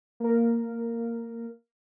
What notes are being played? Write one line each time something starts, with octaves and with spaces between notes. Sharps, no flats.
A#3 A#4